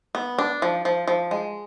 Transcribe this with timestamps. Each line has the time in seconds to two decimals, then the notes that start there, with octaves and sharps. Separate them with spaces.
0.15 B3
0.39 D4
0.62 F3
0.85 F3
1.07 F3
1.31 G#3